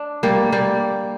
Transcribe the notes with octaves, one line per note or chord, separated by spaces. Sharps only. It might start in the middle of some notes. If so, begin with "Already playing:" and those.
Already playing: D4
G3 A#3
G3 A#3